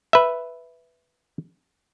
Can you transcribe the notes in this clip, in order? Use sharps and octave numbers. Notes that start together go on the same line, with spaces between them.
B4 E5